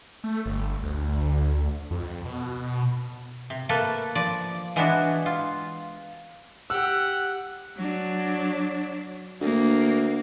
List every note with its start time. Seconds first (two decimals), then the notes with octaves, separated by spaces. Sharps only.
0.24 A3
0.46 G1
0.83 D2
1.91 F2
2.25 B2
3.50 C3
3.69 A3 A#3 A4 B4
4.15 F3 D5
4.76 E3 G#3 B3 D4 E4 F#4
5.26 F4
6.70 G4 F#5 E6 F#6
7.77 F#3 D4
9.41 D2 A#3